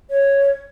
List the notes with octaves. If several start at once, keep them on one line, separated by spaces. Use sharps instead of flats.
C#5